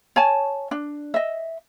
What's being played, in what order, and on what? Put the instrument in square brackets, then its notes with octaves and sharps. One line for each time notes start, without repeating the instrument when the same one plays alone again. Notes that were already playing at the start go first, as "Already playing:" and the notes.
[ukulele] C#5 G#5 A5
D4
D#5 E5